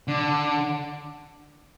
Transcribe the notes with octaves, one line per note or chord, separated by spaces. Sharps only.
D3